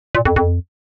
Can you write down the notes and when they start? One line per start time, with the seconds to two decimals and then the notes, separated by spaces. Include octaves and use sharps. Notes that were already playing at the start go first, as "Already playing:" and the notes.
0.15 A#2
0.25 F2
0.36 F2